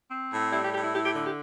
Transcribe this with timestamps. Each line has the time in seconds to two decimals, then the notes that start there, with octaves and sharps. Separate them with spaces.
0.10 C4
0.31 A2
0.53 G3 E4
0.64 G4
0.74 A2 G4
0.84 E4
0.94 E4 G4
1.06 G4
1.15 D3
1.26 G4